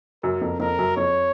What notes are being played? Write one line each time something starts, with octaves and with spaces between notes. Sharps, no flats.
F#2 A#4
F2
F2 A#4
F#2
F2 C#5